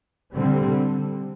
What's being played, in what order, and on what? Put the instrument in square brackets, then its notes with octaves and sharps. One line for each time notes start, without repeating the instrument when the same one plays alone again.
[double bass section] D3 G3 C4